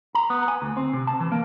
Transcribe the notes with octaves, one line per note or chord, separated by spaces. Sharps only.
A#5
B3
G#5
D2
C4
C3
A5
E3
A#3